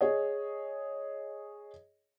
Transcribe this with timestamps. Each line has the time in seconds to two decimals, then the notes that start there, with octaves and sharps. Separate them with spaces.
0.01 G#4 C#5 D#5